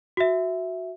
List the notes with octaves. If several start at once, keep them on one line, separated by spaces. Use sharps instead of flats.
F#4 E5